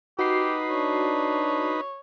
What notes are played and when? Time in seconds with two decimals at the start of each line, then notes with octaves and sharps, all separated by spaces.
0.19 D#4 F#4 G4 B4 C7
0.70 D4 C#5